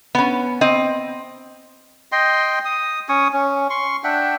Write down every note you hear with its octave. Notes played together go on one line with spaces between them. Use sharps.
B3 C#4
C4 D#5
D#5 G5 C6
D#6
C#4 C#5 D#6
C#4
C6 C#6
D4 E5 F#5 G5